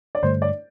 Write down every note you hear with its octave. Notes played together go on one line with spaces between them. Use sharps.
D5
G2 D3 A3 C5
D5